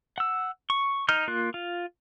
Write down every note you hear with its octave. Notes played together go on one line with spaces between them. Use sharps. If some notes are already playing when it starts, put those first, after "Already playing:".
F#5 E6
C#6
D#4 F6 G6
A#3 F4 F#6
F4